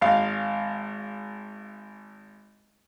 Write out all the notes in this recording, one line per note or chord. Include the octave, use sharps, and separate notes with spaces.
G#1 F5